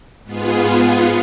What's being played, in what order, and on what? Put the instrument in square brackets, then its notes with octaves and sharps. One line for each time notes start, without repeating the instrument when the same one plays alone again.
[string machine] G#2 B3 F4 G#4